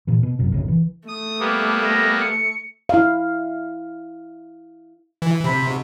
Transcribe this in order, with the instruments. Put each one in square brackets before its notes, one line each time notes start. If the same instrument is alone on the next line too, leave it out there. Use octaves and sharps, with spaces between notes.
[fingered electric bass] A#2 E3
B2
G1 F#2 C3
F#1 C2 A2 C#3
E3
[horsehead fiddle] A3 [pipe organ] D#6
[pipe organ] G3 A#3 B3 [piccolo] D6
[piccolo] A#6
C#7
[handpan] E4 F5
[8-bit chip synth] E3
[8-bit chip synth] C3 [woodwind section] C5 B5
[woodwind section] G#2 B2